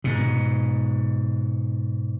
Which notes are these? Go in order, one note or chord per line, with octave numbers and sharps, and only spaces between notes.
G#2 B2